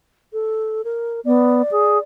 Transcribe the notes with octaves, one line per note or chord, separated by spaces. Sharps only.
A4
A#4
B3 D5
G#4